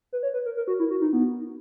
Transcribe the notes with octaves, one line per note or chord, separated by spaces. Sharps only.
B4
C#5
B4
A#4
A#4
F#4
E4
F#4
D#4
B3